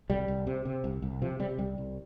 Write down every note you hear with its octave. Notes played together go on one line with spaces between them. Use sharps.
C2 G3
C2
C3
C3
C2
C2
C3 F3
C3 G3
C2 G3
C2